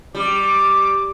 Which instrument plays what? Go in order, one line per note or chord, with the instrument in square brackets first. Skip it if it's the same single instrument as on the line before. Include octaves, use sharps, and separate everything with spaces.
[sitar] G3 [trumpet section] D6